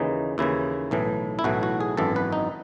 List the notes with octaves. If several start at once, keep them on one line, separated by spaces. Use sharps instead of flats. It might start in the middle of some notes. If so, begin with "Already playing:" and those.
Already playing: D#2 C#3 E3 D#4
D#2 C#3 E3 E4
B1 A2 E3
E4
B1 A2 E3 F#4
F#4
G#4
G#1 F#2 E3 A4
B4
D#4